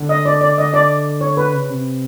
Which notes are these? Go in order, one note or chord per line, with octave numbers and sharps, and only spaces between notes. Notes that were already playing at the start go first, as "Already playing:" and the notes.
Already playing: D3
D#5
D5
D5
D3 D#5
D5
C#5
B4
C#3
C3